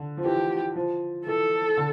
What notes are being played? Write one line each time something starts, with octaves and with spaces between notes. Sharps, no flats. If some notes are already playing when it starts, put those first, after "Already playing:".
Already playing: D3
F3
E3 G4
F3
E3 A4
D3